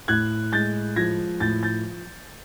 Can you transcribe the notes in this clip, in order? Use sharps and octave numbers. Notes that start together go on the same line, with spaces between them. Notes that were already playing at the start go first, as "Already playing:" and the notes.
A2 F#6 G#6
G#3 G6 A6
F3 G#6 A#6
A2 G6 A6
G6 A6